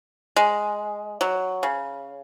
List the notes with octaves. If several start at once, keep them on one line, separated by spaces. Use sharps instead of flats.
G#3
F#3
C#3